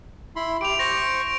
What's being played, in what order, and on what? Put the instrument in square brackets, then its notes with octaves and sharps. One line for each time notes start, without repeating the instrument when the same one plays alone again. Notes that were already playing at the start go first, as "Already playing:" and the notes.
[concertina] E4 B5 C6
[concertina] G4 [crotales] D7 F7
[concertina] C5 C#6 [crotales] A#6
[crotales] D7